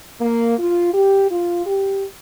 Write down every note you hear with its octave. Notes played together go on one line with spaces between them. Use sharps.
A#3
F4
G4
F4
G4